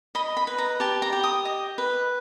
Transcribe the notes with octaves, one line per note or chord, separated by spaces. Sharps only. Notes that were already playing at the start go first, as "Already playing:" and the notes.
D#5 B5
B5
B4
A#5
G4 A5
A#5
G4
D#6
D#5
B4